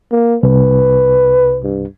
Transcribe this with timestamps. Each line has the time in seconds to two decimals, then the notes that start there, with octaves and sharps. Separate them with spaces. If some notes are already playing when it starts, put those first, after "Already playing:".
0.12 A#3
0.43 C2 B4
1.64 G2